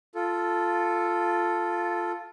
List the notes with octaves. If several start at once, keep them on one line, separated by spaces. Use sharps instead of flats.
F4 A4